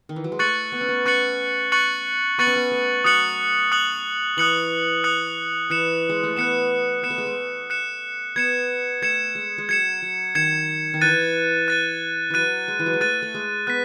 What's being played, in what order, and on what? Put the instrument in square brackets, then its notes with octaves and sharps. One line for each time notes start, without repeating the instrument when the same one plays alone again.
[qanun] D#3
E3
F#3
G#3
[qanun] A3 [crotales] C#6 F#6 A6 C#7 F#7
[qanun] B3
C#4
B3
[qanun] C#4 [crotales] C#6 F#6 A6 C#7 F#7
[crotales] C#6 F#6 A6 C#7 F#7
[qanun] B3 [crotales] C#6 F#6 A6 C#7 F#7
[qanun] C#4
B3
A3
[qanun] F#3 [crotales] D#6 F#6 C#7 F#7
[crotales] D#6 F#6 C#7 F#7
[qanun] E3 [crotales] D#6 F#6 C#7 F#7
[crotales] D#6 F#6 C#7 F#7
[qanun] E3 [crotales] F#6 C#7 E7
[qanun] G#3
A3
[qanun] B3 [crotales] F#6 C#7 E7
[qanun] B3 [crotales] F#6 C#7 E7
[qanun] A3
G#3
A3
[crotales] F#6 C#7 E7
[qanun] B3 [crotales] G#6 C#7 E7
[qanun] A3 [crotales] G#6 C#7 E7
[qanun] G#3
G#3
[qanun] F#3 [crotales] G#6 C#7 E7
[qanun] F#3
[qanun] D#3 [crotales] G#6 C#7 E7
[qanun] D#3
[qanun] E3 [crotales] F#6 A6 D#7
[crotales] F#6 A6 D#7
[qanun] E3 F#3 [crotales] F#6 A6 D#7
[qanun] G#3
E3
F#3
G#3
[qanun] A3 [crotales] F#6 A6 D#7
[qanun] A3
G#3
[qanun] B3 [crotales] F#6 B6